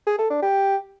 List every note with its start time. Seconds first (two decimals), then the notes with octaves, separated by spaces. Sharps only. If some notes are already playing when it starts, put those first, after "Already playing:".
0.07 G#4
0.19 A4
0.30 D4
0.42 G4